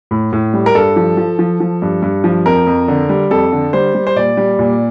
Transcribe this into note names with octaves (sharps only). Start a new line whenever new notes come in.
A2
A2
G3
A#4
G2 A4
F3
F3
F3
F3
G2
G2
F3
F2 A#4
F2
D3
G3
F2 A4
D3
G3 C5
G3
C5
A#2 D5
G3
A#2